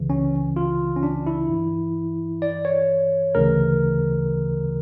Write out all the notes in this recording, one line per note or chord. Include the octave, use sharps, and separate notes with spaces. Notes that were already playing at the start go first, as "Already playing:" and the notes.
Already playing: C#2 C#3 E3
C#4
F4
C#4
D4
E4
G2 E3
D5
C#5
D2 C#3 E3 A#4